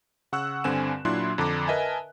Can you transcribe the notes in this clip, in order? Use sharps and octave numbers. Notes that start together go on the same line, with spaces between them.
C#3 F#5 C#6 E6 F#6
G2 D3 C4 G#5 E7
A#2 F#3 D4 E4 C6 F#6
F2 D3 D4 A#5 D6
A#4 B4 D#5 E5 G#5 A5